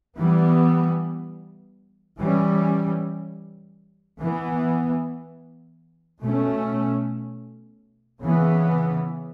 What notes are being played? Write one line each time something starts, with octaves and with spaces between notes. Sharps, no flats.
E3 G3 B3
E3 G3 C#4
E3 B3
B2 A3 C#4
C#3 E3 B3